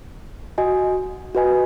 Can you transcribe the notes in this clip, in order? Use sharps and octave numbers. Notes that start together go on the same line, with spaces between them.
F#4 D#5 G#5
F#4 B4 D#5 G#5